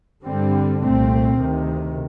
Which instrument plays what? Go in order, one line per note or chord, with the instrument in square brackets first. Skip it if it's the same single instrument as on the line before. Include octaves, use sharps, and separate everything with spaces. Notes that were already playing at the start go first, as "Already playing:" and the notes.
[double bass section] G2 D3 G3 C4
C2 A#2 A3 C4
D2 C3 D#3